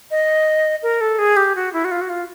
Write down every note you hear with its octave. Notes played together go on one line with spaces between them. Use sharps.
D#5
A#4
A4
G#4
G4
F#4
E4
F#4
F4
F#4
F4